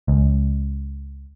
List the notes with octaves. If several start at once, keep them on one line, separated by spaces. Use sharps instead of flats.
C#2